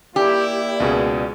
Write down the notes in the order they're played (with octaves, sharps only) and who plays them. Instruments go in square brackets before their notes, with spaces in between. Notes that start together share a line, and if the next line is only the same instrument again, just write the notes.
[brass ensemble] A#3 E4 [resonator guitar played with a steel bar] G4 [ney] D5
[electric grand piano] C#2 B2 G#4